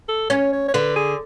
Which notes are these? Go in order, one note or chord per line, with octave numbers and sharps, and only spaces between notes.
A4
C#4 C#5
C#5
C#5
D3 B4
G#4